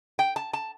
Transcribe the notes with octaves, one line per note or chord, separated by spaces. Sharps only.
G5
A5
A5